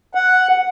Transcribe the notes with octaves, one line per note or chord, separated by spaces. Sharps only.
F#5